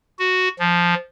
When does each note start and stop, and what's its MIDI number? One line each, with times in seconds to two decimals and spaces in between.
0.19 0.49 66
0.59 0.94 53